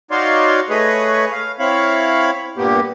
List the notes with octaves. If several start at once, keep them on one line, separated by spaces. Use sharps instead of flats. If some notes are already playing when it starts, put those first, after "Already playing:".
D#4 F#4 C#5 D5 F5 C6
A3 G#4 B4 C#5 D#5
F5
C4 E4 C#5 F5 B5
G2 A#2 A#3 B3 G4